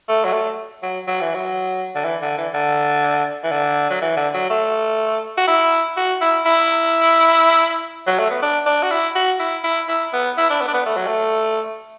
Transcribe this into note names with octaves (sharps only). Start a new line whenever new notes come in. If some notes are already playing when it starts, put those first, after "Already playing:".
A3
F#3
A3
F#3
F#3
E3
F#3
D3
E3
D3
E3
D3
E3
D3
F#3
E3
D3
F#3
A3
F#4
E4
F#4
E4
E4
F#3
A3
B3
D4
D4
F#4
E4
F#4
E4
E4
E4
B3
E4
D4
B3
D4
B3
A3
F#3
A3